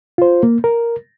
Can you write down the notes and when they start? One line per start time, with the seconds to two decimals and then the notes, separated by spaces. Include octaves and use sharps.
0.18 F4 C5
0.43 A#3
0.64 A#4